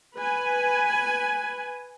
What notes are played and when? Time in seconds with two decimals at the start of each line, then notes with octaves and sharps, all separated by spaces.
0.18 B4 G#5